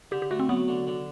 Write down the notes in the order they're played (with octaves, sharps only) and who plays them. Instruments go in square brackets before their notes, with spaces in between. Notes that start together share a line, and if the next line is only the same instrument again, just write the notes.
[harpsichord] D3 [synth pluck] G4
[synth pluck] G4
[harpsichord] A3 [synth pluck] F#4
[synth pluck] C4
[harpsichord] F#3 [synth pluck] B3
[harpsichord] D3
D3